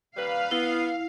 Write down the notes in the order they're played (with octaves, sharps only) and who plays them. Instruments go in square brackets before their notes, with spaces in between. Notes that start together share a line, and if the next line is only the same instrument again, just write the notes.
[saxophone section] D#2 G3 B4 [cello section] F5
[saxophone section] B3 [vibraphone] E4